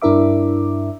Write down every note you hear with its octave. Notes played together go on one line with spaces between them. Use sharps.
G2 D4 E4 A#4 E5 D6